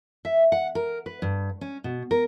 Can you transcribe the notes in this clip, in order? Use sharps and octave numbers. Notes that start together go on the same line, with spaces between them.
E5
F#5
A#4
B4
G2
C#4
B2
A#4